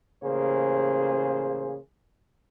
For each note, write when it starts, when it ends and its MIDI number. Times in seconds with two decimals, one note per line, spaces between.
0.23 1.77 33
0.23 1.77 49
0.23 1.77 58
0.23 1.77 68
0.23 1.77 72